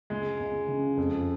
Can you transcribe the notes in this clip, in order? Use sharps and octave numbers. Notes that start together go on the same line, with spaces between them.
C#2 G#3
C#2
C#3
F2